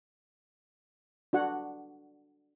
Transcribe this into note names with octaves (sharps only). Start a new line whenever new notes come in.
D4 F#4 F#5